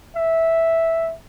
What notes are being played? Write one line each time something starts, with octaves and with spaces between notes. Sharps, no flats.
E5